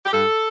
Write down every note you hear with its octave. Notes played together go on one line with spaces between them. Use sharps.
G4
G2 A4